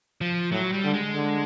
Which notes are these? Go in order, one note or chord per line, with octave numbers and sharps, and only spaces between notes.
F3
A2 F#3
G3
D3
G#3
D3